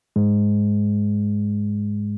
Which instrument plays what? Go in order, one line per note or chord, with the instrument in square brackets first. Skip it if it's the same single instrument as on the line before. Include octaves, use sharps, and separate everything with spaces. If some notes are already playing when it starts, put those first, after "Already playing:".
[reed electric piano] G#2 G#3